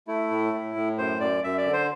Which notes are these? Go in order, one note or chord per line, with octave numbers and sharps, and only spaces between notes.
A3 E4
A2
A2
A2
F#2 C5
F#2 D5
F#2 E5
D5
D3
C5